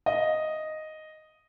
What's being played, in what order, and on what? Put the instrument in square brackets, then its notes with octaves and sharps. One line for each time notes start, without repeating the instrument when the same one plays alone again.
[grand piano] D#5